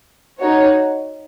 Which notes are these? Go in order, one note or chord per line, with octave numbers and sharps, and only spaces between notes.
D#4 F#4 C#5